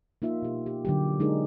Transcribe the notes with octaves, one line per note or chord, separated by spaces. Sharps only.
A#3 D#4 F4 E5
B2 G4
G4
D3 F#3 G4
G#3 D4 D#4 G#4 A#4